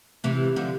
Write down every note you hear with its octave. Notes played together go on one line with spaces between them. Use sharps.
C3 E3
D3 F3